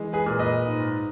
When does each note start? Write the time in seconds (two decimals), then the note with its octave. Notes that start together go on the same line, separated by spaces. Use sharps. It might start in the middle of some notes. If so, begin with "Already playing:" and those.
Already playing: E3 G#3
0.13 G#4 B4
0.26 A#2
0.39 B4 D#5
0.65 G#2